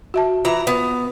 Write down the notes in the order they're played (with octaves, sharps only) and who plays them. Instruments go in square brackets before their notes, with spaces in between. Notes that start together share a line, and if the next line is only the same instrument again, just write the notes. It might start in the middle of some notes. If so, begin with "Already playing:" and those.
[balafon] F#4 E5 A5
[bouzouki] E3 A#5 [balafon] F4 E5
[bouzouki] B3